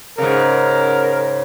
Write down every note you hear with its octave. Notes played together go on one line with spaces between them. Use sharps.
G#2 C#3 A#4